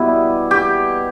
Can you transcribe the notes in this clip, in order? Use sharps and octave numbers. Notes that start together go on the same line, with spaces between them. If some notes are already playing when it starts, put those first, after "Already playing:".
Already playing: B2 G3 B3 E4
G4